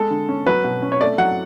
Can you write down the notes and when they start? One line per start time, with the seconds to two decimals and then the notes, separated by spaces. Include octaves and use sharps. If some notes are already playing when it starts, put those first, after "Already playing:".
Already playing: G#3 A4
0.10 D3
0.29 C#4
0.46 F#3 B4
0.64 B2
0.82 C#4
0.92 C#5
1.01 A3 D5
1.18 F#3 F#5